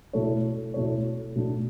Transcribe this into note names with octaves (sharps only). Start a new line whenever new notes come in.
B2 A3 E4 A4 C#5
B2 A3 E4 A4 C#5
B2 A3 D4